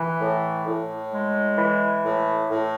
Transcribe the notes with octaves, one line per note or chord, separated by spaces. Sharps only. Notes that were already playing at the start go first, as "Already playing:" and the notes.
Already playing: E3
A2
A2
G#3
E3
A2
A2